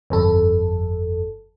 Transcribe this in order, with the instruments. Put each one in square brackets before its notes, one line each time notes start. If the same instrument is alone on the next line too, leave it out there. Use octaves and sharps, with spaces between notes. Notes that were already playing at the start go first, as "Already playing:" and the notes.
[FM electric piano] G1 F2 A4